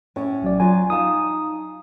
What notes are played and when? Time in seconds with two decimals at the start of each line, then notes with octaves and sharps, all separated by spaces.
0.16 A2 C#4 C#5
0.42 A#1 F#3 D5
0.60 F#3 F4 G#5
0.90 D#4 F5 A5 D#6